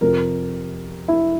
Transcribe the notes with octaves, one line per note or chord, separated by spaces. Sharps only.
F2 C3 F3 A#4
E4